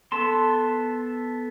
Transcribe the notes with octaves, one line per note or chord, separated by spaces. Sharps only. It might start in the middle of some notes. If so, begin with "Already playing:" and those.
B3 A4 A5 C6